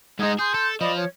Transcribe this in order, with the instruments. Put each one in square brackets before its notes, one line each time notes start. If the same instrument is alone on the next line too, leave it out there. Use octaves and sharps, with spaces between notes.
[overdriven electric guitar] G#2 G#3 [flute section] D#4 D#5 G#6
[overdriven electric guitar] G#4 [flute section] C6 G6
[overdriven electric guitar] A4
[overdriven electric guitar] F3 [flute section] D5 D#5 B5
[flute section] C#5